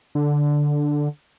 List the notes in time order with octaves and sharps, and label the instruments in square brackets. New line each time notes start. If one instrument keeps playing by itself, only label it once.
[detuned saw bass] D3